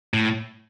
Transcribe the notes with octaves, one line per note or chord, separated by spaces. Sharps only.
A2